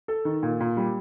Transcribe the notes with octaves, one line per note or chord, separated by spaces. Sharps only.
A4
D#3
A#2
A#2
G3